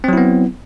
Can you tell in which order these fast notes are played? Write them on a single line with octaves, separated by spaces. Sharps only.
C4 F#3 E4 B3